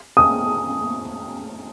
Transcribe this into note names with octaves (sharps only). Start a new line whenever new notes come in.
D#6